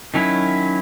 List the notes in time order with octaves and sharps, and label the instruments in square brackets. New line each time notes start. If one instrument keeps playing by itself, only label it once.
[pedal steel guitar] D#3 F#3 C#4 E4